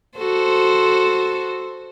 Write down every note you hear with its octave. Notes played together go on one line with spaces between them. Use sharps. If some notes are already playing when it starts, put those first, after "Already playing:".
F#4 A4 C5